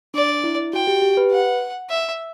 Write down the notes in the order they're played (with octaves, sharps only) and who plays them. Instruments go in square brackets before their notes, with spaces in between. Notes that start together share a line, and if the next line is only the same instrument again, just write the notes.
[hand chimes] D4 [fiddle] D5
[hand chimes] E4
[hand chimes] F#4 [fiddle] G5
[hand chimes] G4
G4
B4
[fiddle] F#5
E5